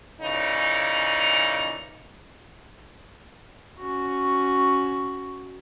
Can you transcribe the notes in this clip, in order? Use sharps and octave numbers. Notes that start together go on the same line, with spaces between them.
A#2 C#3 E3 D#4
C#4 F#4